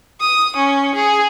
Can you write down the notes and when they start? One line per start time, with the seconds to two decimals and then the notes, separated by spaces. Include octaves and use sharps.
0.20 D#6
0.56 C#4
0.95 G#4